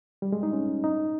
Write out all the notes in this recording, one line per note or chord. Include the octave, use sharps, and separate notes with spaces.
G3
G#3
D#4
C#4
D#4